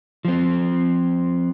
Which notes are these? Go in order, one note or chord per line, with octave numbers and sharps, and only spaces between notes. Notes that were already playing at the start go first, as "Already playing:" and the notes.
F3 C4